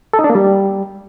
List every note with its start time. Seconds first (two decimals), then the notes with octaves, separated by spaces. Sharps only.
0.13 A4
0.19 D#4
0.24 D4
0.30 A#3
0.35 G3